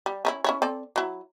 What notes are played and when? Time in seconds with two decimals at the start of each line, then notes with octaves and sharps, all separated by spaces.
0.06 G3
0.25 C#4 D#4 E4
0.44 C#4 E4 C#5
0.62 C4 A4 D5
0.96 F#3 E4